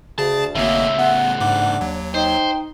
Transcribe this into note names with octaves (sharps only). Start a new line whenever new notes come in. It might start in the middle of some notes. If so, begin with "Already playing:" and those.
D2 C#3 G#4 A5
G#1 A2 C#3 F#3 A#3 D#4 E5
B3 F#5
G#2 D4 D6
D#2 F#3
D#4 C5 G5